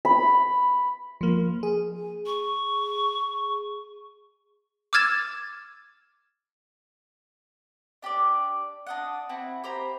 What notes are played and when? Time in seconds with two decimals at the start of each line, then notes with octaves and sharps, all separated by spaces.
0.05 B5
1.21 F3 A#3
1.63 G#4
2.26 C#6
4.93 D6 E6 F6 G#6 A6 E7
8.02 D4 G4 C#5 D5
8.87 D4 D#5 F#5
9.29 C4 E4 F#4
9.64 G4 C5 A#5 B5